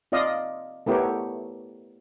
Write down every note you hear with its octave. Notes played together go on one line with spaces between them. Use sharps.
C4 F4 D5 D#5 F5
A3 B3 E4 G4 A#4 C#5